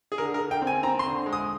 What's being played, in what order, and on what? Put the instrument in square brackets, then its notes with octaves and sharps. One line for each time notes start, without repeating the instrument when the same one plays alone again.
[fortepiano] G#4
D3 A#4
A#4
D3
G5
C4
G#5
C4 A#5
C6
D3
G#3
D#6